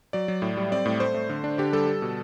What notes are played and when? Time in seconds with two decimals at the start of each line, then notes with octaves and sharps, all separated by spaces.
0.13 F#3 D5
0.28 F#3
0.42 A2
0.57 G3
0.72 C4 D5
0.86 A2
1.00 A3 C5
1.14 A3
1.29 D3
1.44 D4
1.58 D3 G4
1.73 G3 A4
1.87 G3
2.02 B2